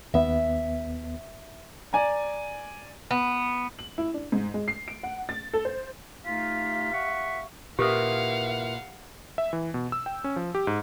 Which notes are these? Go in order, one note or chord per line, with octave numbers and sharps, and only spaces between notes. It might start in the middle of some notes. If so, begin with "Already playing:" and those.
D#2 B3 E5
D5 G#5 A#5
B3
F#7
E4
D4
G#2
G#3
C7
D7
F#5
A6
A4
C5
A3 D#4 F4 G4 F5 B6
E5 F#5 C#6
A#2 E4 G4 A#4 B4 F5 F#5 D#6
E5
E3
B2
E6
G5
C#4
F3
G4
G#2